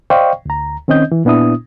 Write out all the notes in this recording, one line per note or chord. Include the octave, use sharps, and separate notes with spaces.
C5 D5 D#5 F5 G5 C#6
D2 A#5
D#3 C4 C#4 D#5 G6
E3
A#2 B3 D4 E4 D#6